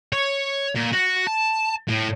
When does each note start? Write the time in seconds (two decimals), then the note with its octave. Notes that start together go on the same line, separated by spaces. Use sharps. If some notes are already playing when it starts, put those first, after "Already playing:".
0.13 C#5
0.75 A#2
0.93 F#4
1.27 A5
1.88 A2